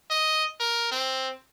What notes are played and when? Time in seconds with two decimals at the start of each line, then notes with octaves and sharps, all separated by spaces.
0.10 D#5
0.60 A#4
0.92 C4